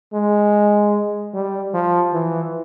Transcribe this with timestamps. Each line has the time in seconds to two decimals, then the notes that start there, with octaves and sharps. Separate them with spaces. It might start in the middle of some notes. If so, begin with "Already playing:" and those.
0.13 G#3
1.34 G3
1.74 F3
2.14 E3